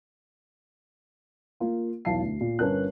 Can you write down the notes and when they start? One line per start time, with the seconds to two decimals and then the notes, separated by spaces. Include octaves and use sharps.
1.60 A#3 F4
2.05 B1 E2 F5 A5 C7
2.21 D2
2.41 A#2
2.59 G1 C#4 A#4 B4 A5 F#6